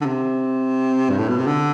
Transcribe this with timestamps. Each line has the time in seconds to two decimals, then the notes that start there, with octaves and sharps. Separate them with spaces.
0.01 D3
0.06 C3
1.10 G2
1.19 A2
1.29 B2
1.38 C3
1.47 D3